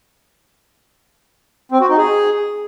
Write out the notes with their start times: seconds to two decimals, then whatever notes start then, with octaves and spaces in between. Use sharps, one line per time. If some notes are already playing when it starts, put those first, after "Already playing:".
1.72 C4
1.81 F#4
1.89 D#4
1.98 G#4